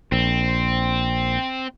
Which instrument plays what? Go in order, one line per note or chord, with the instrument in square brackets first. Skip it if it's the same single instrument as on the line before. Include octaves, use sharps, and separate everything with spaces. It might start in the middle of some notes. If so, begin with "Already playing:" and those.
[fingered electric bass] A#1 [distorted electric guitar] C4